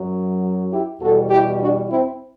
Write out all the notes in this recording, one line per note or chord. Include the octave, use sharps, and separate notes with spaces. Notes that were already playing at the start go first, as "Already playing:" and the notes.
Already playing: F#2 F#3
E4 G4
E2 B2 G3 F#4 A4
E4 G4
D4 F#4
C4 E4